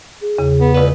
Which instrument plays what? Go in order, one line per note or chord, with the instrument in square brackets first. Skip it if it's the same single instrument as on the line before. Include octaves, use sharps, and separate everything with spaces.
[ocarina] G#4
[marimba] E2 C#3
[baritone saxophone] B3
[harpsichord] C#2 B4 [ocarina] D5